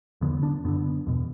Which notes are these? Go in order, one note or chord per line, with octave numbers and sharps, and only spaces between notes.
E2 D3 B3
D4
F#2 D3 B3
E2 B2